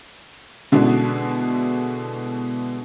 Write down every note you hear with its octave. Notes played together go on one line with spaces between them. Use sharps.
B2 D3 G#3 D4 E4 F#4